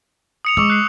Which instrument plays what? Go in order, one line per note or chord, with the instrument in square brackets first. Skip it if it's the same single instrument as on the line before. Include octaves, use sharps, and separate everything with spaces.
[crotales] D#6 C#7 F7
[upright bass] G#3 [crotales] C#6 D6 E6
[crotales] F#6 C7